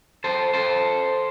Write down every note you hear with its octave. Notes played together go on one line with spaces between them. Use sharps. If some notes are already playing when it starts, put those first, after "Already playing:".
A4 C5
A4 C5